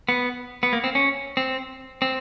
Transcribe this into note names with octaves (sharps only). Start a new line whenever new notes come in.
B3
B3
A#3
C4
C#4
C4
C4